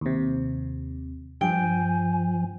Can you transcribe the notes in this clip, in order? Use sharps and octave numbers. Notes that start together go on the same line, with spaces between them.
D#2 C3
G2 F3 G5 G#5